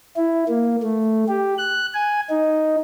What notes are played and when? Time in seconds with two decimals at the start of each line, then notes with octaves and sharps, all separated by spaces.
0.16 E4
0.48 A#3
0.83 A3
1.29 G4
1.58 F#6
1.94 G#5
2.30 D#4